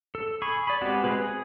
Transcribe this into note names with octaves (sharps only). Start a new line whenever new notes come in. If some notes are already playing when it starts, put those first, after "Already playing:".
A4
G#4 B5 C#6
D5 B5
G#3 B3 C4 F#4 G4
G#3 C4 G#4 B4
G#4